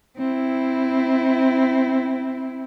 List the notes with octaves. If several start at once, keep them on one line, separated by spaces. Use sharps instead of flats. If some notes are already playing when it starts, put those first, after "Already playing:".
C4 E4